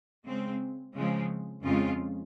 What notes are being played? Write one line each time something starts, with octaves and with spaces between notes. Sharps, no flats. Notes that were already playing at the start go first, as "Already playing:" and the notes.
C#3 G#3 C4
C#3 F3 G#3 C4
F2 C#3 G#3 C4 F4